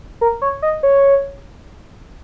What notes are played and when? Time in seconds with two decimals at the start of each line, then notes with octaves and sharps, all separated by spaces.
0.21 A#4
0.42 C#5
0.62 D#5
0.83 C#5